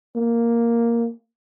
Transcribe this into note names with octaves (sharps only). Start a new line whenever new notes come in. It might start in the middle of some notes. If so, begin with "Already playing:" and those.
A#3